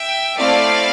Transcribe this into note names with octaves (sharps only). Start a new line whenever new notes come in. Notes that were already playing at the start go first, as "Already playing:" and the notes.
Already playing: E5 G5
A3 C4 E4 D5 F5